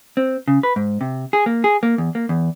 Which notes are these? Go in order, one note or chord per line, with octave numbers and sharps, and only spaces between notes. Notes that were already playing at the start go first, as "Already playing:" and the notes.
C4
C#3
B4
G#2
C3
G#4
A#3
G#4
A#3
E2
A#3
E2